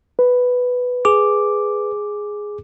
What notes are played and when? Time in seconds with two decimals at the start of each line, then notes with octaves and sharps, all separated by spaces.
0.19 B4
1.05 G#4 D6